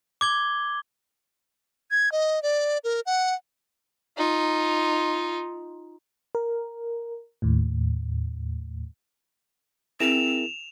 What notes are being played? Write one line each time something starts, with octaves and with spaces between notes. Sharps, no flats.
D6 G#6 G7
G#6
D#5
D5
A#4
F#5
D#4 F4
A#4
D#2 A2
C4 E4 G#4 A#4 E7 F7